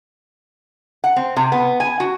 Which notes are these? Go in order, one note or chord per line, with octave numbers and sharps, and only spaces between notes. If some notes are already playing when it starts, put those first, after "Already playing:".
F#5
C4
C3
B3
G#5
F#4